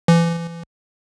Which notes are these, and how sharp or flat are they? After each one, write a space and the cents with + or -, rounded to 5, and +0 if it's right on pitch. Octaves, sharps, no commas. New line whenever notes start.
E3 +35